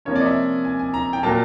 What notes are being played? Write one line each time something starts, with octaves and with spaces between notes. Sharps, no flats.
C3 F3 A#3 C#4 C#5
D5
D#5
E5
G#5
G#5
A#5
G5
A#2 F#3 A#3 A5